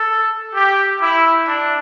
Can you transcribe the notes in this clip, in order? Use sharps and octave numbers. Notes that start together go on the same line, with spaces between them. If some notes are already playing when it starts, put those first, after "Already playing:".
Already playing: A4
G4
E4
D4